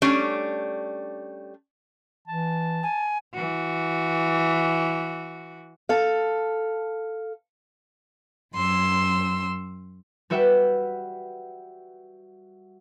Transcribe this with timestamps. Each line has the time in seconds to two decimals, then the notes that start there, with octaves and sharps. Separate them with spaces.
0.02 G3 A3 C#4 D4
2.28 E3 A5
2.83 G#5
3.34 E3 F#4
5.89 A4 F5
8.54 F#2 C6 E6
10.30 G3 F#4 B4 E5 F#5 G5